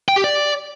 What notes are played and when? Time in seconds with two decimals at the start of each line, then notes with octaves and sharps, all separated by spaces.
0.09 G5
0.16 G4
0.24 D5